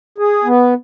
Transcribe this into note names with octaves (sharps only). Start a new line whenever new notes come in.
G#4
B3